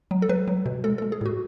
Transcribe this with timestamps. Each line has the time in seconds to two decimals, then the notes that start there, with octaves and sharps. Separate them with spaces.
0.11 F#3
0.22 A4
0.29 F#3 B4
0.48 F#3
0.66 B2
0.84 G#3 A4
0.98 G#3 A4
1.12 G#4
1.21 A2 F#4